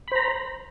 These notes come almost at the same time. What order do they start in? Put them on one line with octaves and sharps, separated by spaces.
B5 C5 A#5